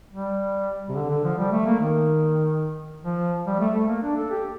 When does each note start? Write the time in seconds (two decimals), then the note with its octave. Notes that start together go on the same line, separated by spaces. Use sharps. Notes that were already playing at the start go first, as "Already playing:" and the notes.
0.13 G3
0.89 C3
0.96 D3
1.10 D3
1.24 F3
1.38 G3
1.52 A3
1.66 A#3
1.79 D#3
3.04 F3
3.47 G3
3.60 A3
3.75 A3
3.88 A#3
4.02 D4
4.17 A4
4.31 G4